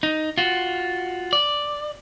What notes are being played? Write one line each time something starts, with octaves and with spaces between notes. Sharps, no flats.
D#4
F4 F#4
D5